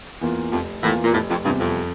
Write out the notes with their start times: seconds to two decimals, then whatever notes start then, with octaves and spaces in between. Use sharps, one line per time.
0.21 E2 E3 A#3 F4
0.51 F1 F2
0.83 E2 A2 E3 A#3 F4
1.04 A#2
1.13 F1 A2
1.29 F2
1.44 E2 G2 C3 G3 C4
1.60 F2